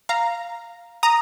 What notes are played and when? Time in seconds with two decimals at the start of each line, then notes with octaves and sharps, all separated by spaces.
0.09 F5 A#5
1.03 A#5 D#6